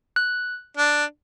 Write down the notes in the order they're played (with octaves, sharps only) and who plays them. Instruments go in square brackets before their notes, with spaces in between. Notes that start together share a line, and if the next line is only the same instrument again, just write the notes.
[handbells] F#6
[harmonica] D4